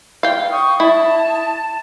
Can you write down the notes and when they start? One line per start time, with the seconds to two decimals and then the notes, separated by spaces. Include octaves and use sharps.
0.23 F5 G5
0.51 C#6 D#6
0.80 E4 A5